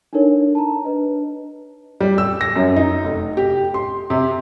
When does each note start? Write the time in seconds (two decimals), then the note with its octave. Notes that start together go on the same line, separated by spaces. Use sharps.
0.13 D4 D#4 A4 A#4 C#5
0.55 A5 A#5
0.85 D4 B4 D#5
2.01 G3
2.18 E6
2.41 A#6
2.56 F#2
2.76 D#4
3.04 F1
3.37 G4
3.74 C6
4.10 C3